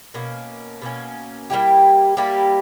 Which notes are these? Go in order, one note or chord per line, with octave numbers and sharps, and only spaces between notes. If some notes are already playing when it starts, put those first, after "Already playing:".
B2 A#3 C#4
B2 A#3 C#4
G3 A#3 E4 G4
G3 A#3 E4 G4